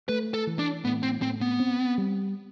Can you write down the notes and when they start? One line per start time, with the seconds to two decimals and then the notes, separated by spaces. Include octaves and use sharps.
0.09 A3 B4
0.34 A4
0.47 E3
0.59 D4
0.85 A2 B3
1.03 C4
1.22 A2 C4
1.41 B3
1.60 C4
1.98 G3